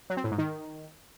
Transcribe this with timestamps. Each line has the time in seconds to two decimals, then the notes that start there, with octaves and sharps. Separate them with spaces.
0.10 F#3
0.17 C4
0.24 A2
0.31 G#2
0.38 D#3